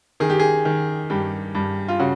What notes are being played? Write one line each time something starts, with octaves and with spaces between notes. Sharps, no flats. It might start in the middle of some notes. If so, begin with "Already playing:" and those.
D#3 G#4
G4
G#4
D#3
G2 G4
G2
F4
C#3 F#4